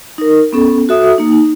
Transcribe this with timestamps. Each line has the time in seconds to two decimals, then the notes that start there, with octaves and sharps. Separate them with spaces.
0.18 D#4 A#4
0.53 B3 C#4 A4
0.89 F#4 A4 E5 D#6
1.18 A#3 D#4
1.32 D#4